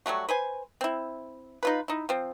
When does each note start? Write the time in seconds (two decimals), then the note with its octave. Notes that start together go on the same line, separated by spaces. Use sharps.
0.06 F#3 G3 A3 F#4
0.29 B4 C5 G#5
0.81 C4 E4
1.63 D#4 F4 B4
1.88 D#4 E4
2.09 F3 C4